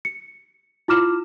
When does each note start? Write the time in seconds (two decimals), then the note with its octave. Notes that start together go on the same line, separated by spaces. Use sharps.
0.05 C#7
0.88 E4 F4 D6 F6 E7